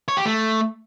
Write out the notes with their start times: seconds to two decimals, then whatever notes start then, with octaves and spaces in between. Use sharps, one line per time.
0.08 C#5
0.17 G4
0.25 A3